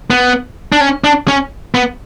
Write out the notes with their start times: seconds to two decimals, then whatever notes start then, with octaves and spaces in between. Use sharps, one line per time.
0.10 B3
0.72 D4
0.81 C#4
1.04 D4
1.28 C#4
1.75 B3